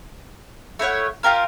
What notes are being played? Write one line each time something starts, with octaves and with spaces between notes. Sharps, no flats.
A3 E4 C#5 F#5
F4 G4 A#4 F5